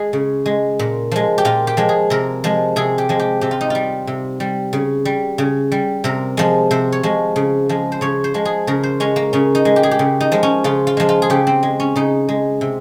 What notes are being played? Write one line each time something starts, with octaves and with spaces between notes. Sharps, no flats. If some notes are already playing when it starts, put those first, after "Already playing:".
Already playing: G#3 G#4
C#3
G#3
A#2
F3 G#3
G4
A#2 F4
G4
F3 G#3
G#4
C3 A#4
F3 G#3
C3 G#4
G4
F3 G#3
G4
C3 G4
F4
D#4
G3 F4
C3
G3
C#3
G3
C#3
G3
C3 A#4
F3 G#3
C3 C5
C#5
F3 G#3
C#3
F3 G#3
C5
C#3 C#5
C5
F3 G#3
G#4
C#3 A#4
C5
G#3 C#4
A#3
C#3 C#4
D#4
G#3
G4
G#4
G4
C#3
D#4
F3 G#3
C#4
C#3 F4
F4
F3 G#3
F4
G#4
C#3 G4
C4
G#3
C#4
C#3 D#4
G#3
C3